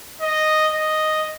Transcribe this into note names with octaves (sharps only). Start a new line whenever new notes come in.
D#5
D#5